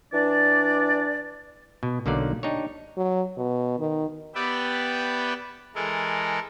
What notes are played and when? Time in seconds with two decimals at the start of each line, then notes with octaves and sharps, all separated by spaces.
0.13 E3 D4 D5
1.83 B2
2.06 B1 D3 F#3 A#3 D#4 D5
2.43 D4 D#4 G4 C#5
2.97 F#3
3.37 B2
3.79 D#3
4.35 B3 G4 B4 D5 E5 G5
5.75 E3 G#3 A4 A#4